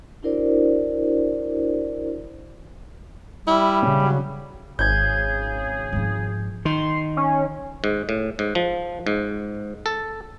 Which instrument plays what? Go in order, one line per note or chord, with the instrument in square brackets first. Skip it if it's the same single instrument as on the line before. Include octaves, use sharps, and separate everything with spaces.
[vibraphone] D4 E4 F#4 A#4 C5 D5
[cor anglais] G3 [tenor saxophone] E4
[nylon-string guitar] C#3 C#4
[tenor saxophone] F#3
[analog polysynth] G#1 [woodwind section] C#3 G#4 [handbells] G6 G#6
[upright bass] G#2 F3
[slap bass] D#3 [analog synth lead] C6
[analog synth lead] C#4
[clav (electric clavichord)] G#2
A2
G#2
F3
G#2
A4